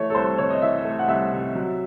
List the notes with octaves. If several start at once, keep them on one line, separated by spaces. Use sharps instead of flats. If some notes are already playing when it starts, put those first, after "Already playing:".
Already playing: E3 A3 C#5
A4
C2 C5
C3 C#5
D#5
E3 E5
A3
F#5
C2 E5
C3
F#3